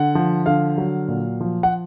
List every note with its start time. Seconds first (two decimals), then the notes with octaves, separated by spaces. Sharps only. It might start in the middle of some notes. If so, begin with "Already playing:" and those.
Already playing: D3 F#5
0.15 F3
0.46 D3 F5
0.78 F#3
1.08 A#2
1.41 F3
1.63 F#5